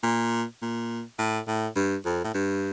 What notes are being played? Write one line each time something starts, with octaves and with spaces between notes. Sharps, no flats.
A#2
A#2
A2
A2
G2
F2
A2
G2